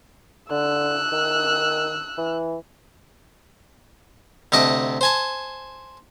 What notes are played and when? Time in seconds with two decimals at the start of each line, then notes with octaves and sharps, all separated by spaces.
0.51 D3 E6 F#6
1.12 D#3
2.18 E3
4.52 D2 C3 D#5 A5 D6
5.01 C5 G#5 A5